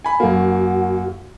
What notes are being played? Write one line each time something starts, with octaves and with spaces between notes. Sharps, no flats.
G#5 B5
F#2 A#3 F#4